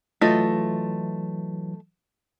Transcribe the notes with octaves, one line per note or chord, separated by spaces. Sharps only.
E3 F#3 A3 F4 D#5